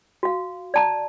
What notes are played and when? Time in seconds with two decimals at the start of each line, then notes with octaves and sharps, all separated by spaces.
0.23 F#4 F5
0.74 D5 A5 A#5